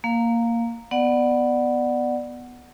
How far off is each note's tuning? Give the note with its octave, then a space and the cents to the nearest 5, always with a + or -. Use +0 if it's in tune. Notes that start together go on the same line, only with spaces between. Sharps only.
A#3 -10 F5 +10
B3 +0 D5 +15 F#5 +0